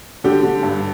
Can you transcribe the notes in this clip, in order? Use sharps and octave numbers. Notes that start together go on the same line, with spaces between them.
D3 G4
D3
G2